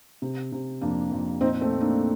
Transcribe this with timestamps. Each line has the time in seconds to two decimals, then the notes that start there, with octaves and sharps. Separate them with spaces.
0.22 C3
0.52 C3
0.81 F2 A#3 D4
1.12 F2
1.41 A#2 C4 D#4
1.61 A3 C4
1.72 A#2
1.81 A#3 D4